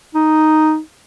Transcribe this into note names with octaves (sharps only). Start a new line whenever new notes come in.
D#4